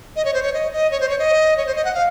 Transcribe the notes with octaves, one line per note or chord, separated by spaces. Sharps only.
D#5
C#5
C5
C#5
D#5
D#5
C#5
C5
C#5
D#5
C#5
C5
D#5
F#5
F5